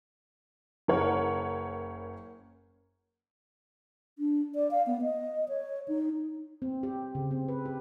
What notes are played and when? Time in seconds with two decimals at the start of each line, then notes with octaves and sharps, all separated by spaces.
0.88 F#1 A#4 B4 C#5 F#5
4.19 D4
4.55 D5
4.71 F5
4.87 B3
5.02 D#5
5.49 C#5
5.88 D#4
6.62 C4
6.83 G4
7.15 C#3
7.31 C4
7.48 B4
7.65 G4